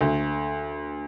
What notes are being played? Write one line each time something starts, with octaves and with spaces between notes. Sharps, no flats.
D2